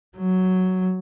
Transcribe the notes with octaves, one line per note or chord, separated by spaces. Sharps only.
F#3